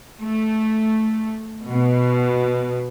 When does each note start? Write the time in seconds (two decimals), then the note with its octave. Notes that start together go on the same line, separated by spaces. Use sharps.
0.20 A3
1.66 B2